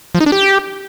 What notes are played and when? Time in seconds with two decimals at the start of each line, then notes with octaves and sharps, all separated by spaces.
0.15 F3
0.20 D#4
0.26 D4
0.32 G4